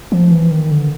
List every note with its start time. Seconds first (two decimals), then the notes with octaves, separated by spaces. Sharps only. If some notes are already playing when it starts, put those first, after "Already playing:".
0.12 F3
0.31 E3
0.51 D#3
0.71 D3